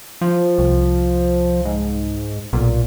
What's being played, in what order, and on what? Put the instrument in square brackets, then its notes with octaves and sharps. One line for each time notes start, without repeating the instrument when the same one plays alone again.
[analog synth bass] F3
[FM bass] C2
[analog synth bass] G#2
[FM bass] B1 [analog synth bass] A#2